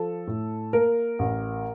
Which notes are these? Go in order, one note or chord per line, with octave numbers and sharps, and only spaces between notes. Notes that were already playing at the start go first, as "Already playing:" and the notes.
Already playing: F3 A4
A2
A#3 A#4
A1